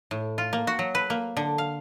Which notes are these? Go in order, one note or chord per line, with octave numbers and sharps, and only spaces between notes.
A2
F4
A#3
F#4
F#3
B4
A#3
D3
F5